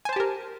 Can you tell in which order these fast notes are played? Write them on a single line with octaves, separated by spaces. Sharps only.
G#5 C5 A5 G4 A#4